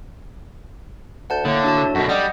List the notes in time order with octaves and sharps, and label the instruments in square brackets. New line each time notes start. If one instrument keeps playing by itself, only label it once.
[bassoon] D2 [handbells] F#5 A5 G6
[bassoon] A2 [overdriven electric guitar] D3 [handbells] A#3
[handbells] D4 F#4 A5
A4
[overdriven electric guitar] F#2 B2 [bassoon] F#4
[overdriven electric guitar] G3 [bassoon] D4 [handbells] D#5 F#5 D#6